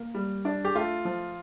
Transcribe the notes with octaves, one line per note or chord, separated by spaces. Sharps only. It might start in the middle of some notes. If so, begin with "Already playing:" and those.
Already playing: A#3
G3
D4
G4
A3 F4
F3